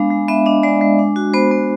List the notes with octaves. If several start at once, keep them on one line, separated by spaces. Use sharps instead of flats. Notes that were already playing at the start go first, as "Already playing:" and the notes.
Already playing: G#3 B3 D4 F5
G#3
B3 E5
D4 D#5
G#3 D5
G#3
D4
F#4
B3 C5
B3